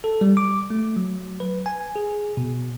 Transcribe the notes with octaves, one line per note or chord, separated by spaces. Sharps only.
A4
G3
D6
A3
F#3
B4
G#5
G#4
B2